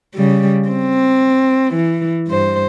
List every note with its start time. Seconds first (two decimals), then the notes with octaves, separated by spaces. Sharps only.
0.15 C#3 G3
0.69 C4
1.74 E3
2.28 G2 C5